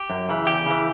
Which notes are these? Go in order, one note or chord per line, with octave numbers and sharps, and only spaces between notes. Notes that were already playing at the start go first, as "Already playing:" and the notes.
Already playing: G4
F#2
C#3 E3
E2 G4
C#3 E3